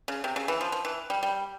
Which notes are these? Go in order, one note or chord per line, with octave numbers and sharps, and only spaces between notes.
C#3
C3
C#3
E3
F3
F3
E3
G3
G3